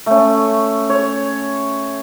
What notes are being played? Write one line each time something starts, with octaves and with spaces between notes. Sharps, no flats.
A3 C#4
C#5